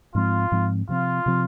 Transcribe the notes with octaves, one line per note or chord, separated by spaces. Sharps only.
G#2 F3 G#3 C4 F4
G#2 F3 G#3 C4
C3 F3 C4 F4
C3 F3 C4